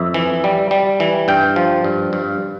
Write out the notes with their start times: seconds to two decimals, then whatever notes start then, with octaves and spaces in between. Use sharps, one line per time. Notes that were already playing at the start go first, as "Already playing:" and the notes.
Already playing: F2 E5
0.14 E3
0.44 G3
0.71 G3
1.00 E3
1.28 G2 G5
1.56 F3
1.84 G2
2.13 G2